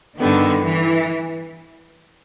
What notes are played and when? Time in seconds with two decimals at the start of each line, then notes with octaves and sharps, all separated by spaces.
0.18 G2 D3 D#3 G3 B3
0.63 E3